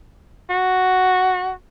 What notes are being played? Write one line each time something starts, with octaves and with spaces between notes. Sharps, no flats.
F#4